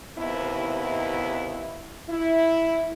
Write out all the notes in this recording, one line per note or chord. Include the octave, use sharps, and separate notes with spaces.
D#2 C3 B3 E4
E4